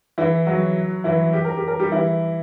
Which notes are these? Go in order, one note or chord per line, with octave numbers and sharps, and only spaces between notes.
E3 E4
F#3 F#4
E3 E4
G4
A#4
G4
A#4
G3 G4
E3 E4